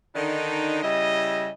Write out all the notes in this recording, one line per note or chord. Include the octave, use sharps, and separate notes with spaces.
D3 D#3 D4 D#4
C#3 G3 E4 D#5